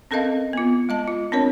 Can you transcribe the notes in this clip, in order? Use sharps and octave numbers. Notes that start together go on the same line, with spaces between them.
C4 C#4 A4 A#4 D#5 F5
B3 F4
G#3 D#5 A5
F4
C4 D4 A#4 C#5